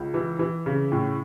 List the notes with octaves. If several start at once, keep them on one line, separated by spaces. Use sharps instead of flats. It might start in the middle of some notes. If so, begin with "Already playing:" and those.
Already playing: C#2
E3
E3
C#3
A2